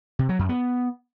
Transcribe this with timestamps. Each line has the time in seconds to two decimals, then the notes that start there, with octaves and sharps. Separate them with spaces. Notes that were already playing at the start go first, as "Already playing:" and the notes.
0.19 C3
0.29 F#3
0.39 F#2
0.49 B3